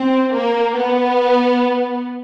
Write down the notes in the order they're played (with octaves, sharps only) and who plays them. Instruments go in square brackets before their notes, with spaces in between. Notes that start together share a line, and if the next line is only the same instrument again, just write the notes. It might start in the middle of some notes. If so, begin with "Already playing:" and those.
Already playing: [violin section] C4
A#3
B3